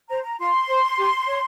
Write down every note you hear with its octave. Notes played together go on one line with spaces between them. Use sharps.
C5 A#5
A#5
F4 C6
C5
G4
C#5